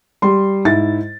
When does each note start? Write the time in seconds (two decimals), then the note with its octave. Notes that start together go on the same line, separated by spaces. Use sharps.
0.22 G3 C6
0.65 G#2 E4 A6